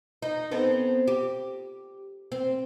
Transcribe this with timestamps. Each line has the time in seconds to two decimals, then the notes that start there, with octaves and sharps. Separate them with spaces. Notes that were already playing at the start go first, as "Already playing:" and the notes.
0.22 D#4
0.51 B3 C4 A4
1.07 G4
2.32 C4